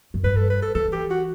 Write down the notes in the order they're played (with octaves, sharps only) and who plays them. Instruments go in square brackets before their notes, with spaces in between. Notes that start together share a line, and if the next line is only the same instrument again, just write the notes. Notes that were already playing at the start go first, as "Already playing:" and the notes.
[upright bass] F#2
[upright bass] G2 [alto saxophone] B4
[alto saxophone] A4
B4
A4
[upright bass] E3 [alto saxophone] A4
[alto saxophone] G4
F#4